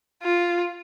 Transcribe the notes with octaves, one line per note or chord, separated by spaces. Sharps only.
F4